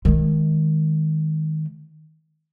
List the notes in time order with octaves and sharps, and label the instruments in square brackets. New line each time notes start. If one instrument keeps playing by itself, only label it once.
[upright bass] D#3 G#3